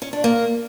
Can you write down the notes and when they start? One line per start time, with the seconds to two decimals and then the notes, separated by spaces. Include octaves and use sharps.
0.02 C#4
0.13 D4
0.24 A#3